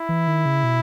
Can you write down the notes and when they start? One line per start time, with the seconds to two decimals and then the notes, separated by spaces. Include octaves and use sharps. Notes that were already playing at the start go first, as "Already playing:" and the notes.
Already playing: E4
0.09 E3
0.27 D#3
0.46 C#3
0.64 B2